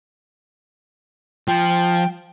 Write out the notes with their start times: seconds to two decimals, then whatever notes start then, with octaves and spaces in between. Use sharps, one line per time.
1.48 F3 G5